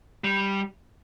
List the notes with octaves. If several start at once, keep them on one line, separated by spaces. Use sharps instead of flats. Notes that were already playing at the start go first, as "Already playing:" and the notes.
G3